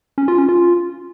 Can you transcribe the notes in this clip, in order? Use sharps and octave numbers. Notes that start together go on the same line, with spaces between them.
C#4
F4
C#4
F4